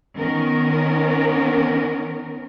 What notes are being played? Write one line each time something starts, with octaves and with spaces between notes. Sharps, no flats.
D#3 B3 C#4 A#4